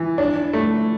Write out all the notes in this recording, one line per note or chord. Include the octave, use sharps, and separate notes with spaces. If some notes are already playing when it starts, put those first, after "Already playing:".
Already playing: E3
D4
A3